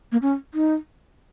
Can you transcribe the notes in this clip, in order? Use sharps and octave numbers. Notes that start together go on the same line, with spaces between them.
A#3
C#4
D#4